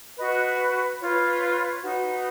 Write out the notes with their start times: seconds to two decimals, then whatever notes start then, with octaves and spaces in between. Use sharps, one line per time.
0.17 F#4 B4 D#5
1.00 F4 B4 C#5
1.82 D#4 F#4 B4